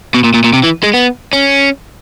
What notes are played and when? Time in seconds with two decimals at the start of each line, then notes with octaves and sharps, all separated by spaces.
0.14 B2
0.24 A#2
0.34 A#2
0.44 A#2
0.53 C3
0.64 E3
0.83 G#3
0.94 B3
1.33 C#4